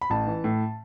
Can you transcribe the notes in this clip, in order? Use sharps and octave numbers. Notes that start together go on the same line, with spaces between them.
B5
A1 A5
E3
A2